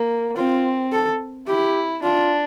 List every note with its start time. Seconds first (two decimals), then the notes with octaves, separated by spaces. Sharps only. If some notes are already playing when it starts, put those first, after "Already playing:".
Already playing: A#3
0.37 C4 F4
0.92 A4
1.47 E4 G4
2.03 D4 F4